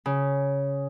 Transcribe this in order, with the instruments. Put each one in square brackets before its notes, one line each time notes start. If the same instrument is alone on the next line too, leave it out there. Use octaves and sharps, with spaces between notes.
[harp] C#3